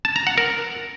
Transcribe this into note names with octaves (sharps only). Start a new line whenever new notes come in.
A5
A#5
F#5
A#4